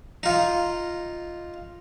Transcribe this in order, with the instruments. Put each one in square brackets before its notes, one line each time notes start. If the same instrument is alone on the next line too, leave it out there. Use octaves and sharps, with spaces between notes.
[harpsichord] D#4 F4